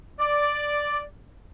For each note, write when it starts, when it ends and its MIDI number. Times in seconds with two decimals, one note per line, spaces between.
0.20 1.02 74